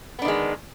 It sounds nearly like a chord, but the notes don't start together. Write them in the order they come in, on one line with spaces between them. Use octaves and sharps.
B3 D4 D#3 G#3